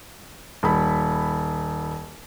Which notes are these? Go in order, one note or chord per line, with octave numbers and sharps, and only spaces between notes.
D#1 B5